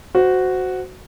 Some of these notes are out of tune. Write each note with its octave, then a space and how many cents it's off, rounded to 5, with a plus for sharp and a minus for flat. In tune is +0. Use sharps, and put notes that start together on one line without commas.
F#4 +0 C5 -15